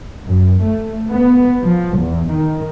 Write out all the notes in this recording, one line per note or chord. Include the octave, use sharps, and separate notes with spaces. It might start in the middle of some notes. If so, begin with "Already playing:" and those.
F#2
A3
B3
F3
E2
D#3